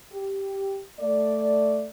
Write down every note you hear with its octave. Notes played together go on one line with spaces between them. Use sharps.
G4
A3 D5